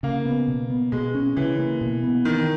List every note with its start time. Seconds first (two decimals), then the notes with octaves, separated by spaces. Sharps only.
0.03 C#3 A#3
0.25 B3
0.48 B2
0.70 B3
0.92 B2 G#3
1.15 C#4
1.36 C#3 E3
1.59 A#3
1.81 B2
2.03 B3
2.25 D#3 E3